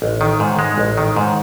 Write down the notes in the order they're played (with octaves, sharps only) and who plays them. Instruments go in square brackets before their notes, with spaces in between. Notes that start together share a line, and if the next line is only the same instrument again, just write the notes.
[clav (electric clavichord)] A1
D#3
G#2
G#3
A1
D#3
G#2